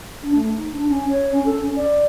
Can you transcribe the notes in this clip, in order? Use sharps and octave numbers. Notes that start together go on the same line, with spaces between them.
D4
A3
D#4
D4
C#4
C#5
C#4
A4
C#4
D5